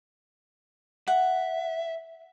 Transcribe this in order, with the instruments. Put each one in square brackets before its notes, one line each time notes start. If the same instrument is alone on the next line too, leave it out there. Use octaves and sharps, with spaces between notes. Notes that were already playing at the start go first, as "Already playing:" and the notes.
[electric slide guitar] E5 [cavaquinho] F#5